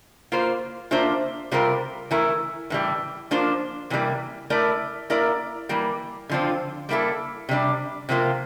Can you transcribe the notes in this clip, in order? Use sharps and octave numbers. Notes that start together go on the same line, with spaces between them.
A#3 F4 C5
A#3 D4 F4 C5 E5
C3 G3 C4 F4 A#4
E3 A3 E4 A#4
A2 E3 G3
F3 A#3 D4 F4 C5
C3 E3 G3 A#3
A3 E4 A#4 D5
A#3 E4 A#4 D5
E3 G3 A#3
D3 F3 C4 F4
G3 A#3 E4 A4
C3 G3 D4
C3 F3 A#3 F4